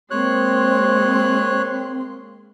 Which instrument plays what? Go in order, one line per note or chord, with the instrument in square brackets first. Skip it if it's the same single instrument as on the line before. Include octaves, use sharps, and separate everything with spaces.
[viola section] G#3 A#3 C6 [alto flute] C4 [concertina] C#5 F#6